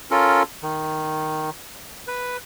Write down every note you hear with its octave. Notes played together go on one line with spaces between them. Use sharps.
C#4 F4 A4 A#4
D#3
B4